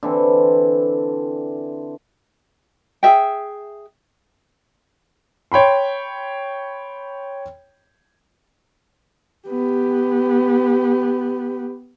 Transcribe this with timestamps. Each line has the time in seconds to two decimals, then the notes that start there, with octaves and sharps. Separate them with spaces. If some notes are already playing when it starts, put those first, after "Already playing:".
0.03 D3 E3 C4
3.03 G#4 E5 G5
5.52 C#5 G5 B5 C6
9.48 B3 G4